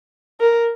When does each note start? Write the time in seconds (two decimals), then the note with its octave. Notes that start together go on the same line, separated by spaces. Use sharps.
0.40 A#4